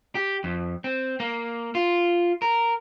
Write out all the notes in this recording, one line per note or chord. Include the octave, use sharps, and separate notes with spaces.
G4
F2
C4
A#3
F4
A#4